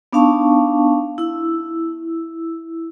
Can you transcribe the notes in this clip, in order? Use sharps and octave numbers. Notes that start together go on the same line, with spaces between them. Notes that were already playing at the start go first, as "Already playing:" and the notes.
B3 D4 D#4 F5 A5 C#6
E4 E6